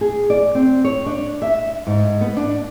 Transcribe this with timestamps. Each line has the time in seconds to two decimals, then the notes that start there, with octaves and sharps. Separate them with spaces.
0.01 G#4
0.30 D5
0.55 C4
0.85 C#5
1.06 D4
1.42 E5
1.87 G#2
2.21 B3
2.37 D4